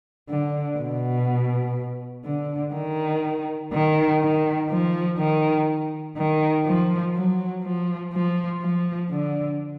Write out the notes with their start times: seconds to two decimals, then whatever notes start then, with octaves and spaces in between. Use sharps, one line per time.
0.29 D3
0.79 B2
2.25 D3
2.74 D#3
3.73 D#3
4.22 D#3
4.70 F3
5.19 D#3
6.18 D#3
6.66 F3
7.15 F#3
7.64 F3
8.13 F3
8.62 F3
9.11 D3